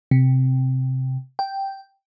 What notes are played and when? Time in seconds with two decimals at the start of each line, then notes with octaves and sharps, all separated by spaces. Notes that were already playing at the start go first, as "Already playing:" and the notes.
0.11 C3
1.39 G5